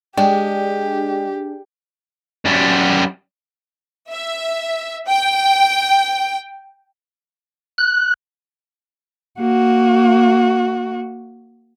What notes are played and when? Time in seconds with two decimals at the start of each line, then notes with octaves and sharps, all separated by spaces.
0.17 G#3 D4 G4 G#4 G5
2.45 F#2 G3
4.12 E5
5.09 G5
7.78 F#6
9.40 A#3 F#4